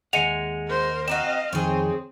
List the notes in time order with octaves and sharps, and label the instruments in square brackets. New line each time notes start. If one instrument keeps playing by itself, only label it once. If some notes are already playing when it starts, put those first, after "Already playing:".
[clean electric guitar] D#2 E5 F#5 [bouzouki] G#3 [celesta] C#7 D#7 F7
[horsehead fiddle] A#4 C5
[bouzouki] C4 D#4 F#4 [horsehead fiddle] D#5 F5 [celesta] E7
[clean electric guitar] F2 D#3 G5 [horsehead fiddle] C4 [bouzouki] G#4 C#5